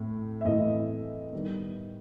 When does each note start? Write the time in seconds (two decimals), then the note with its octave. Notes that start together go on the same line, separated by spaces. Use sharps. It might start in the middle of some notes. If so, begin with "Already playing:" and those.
Already playing: A2 A3 C4
0.41 E5
0.45 A2 E3 A3 C4 D#5
1.33 D#3 G3 B3